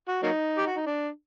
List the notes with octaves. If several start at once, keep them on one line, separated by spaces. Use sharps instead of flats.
F#4
F#3 A#3 D#4
G4
F#4
D#4
D4